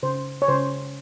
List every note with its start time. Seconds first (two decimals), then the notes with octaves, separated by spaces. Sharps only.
0.03 C#3 C5
0.42 C#5
0.48 C#3 C5